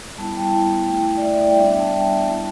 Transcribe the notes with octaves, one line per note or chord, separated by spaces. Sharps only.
G3 B3 E4 A5
G5
A5
G3 B3 E4 G5
A3 E4
D5
A3 E4 E5
D5
D5
G5
G3 B3 D4 E5
G5
A5
G3 B3 D4
G3 E4 A5